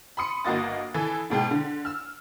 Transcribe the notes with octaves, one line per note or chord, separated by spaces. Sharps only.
B5 C6 D#6 C#7
G1 A#3 F#4 D#5 A6
E3 A4 G#5
G#2 B2 G#3 G5
D3
E6 F6